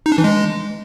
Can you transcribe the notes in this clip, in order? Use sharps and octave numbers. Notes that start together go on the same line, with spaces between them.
D#4
D4
E3
G#3